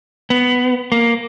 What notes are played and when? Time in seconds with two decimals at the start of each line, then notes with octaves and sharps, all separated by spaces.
0.30 B3
0.92 A#3